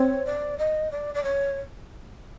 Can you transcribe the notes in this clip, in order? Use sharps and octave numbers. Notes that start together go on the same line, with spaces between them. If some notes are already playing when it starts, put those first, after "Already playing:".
Already playing: C4 C#5
D5
D#5
D5
D5
C#5